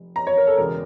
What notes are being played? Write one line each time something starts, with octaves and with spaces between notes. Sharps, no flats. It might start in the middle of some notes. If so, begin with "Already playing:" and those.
Already playing: F1
A#5
C#5
A#4
A4
E1 E2 C#3 A#4